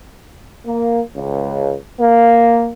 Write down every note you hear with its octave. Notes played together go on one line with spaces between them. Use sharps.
A#3
C#2
A#3